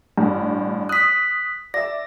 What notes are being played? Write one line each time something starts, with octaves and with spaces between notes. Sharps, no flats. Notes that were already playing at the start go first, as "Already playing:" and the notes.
A1 G2
D#6 F#6 B6
D5 E5 A#6